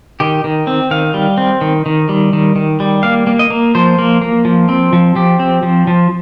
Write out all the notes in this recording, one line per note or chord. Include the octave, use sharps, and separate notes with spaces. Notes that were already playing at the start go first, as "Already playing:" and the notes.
D#3 G4
D#3
C4
D#3 F5
G3
C4
D#3
D#3
G3
D#3
D#3
G3
A#3 F5
A#3
D#5
A#3
F3 C5
A#3
A#3
F3
C4
F3
F3 G4
C4
F3
F3